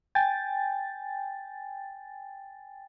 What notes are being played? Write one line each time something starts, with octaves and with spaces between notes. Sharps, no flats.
G5 G#5 A6